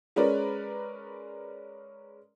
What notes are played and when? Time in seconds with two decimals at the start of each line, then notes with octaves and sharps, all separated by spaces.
0.16 G#3 C#4 A#4 B4 D5